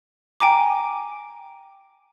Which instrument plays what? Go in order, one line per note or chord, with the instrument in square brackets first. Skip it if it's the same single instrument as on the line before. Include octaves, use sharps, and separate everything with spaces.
[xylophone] G5 G#5 A#5 D6